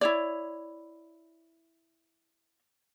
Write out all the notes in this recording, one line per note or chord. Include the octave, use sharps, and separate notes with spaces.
E4 C#5 D5